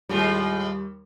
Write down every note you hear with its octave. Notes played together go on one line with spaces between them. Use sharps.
D#2 A2 G3 G#3 F4